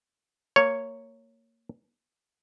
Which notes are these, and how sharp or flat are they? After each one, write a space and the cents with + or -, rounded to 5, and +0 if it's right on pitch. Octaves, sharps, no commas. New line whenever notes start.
A#3 -20 C#5 +0